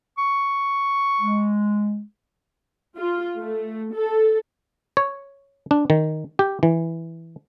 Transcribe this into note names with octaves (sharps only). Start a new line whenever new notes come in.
C#6
G#3
F4
A3
A4
C#5
D4
D#3
G4
E3